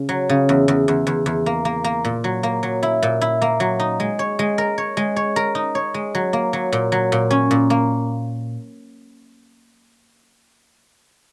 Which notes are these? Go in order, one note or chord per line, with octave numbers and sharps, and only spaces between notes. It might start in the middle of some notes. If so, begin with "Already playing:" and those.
Already playing: C#3
F#3
C#3
E2
E2
E2
E2
E2
A#3
A#3
A#3
A#2
F#3
A#3
F#3
E4
A#2
E4
A#3
F#3
D#4
G#3
C#5
G#3
A#4
C#5
G#3
C#5
A#4
D#4
C#5
G#3
F#3
A#3
F#3
A#2
F#3
A#2
C#4
A#2
A#3